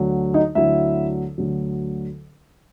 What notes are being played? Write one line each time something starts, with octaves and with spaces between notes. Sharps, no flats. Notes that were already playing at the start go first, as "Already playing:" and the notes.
Already playing: D2 D3 F#3
D#4 D#5
D2 D3 F#3 E4 E5
D2 D3 F#3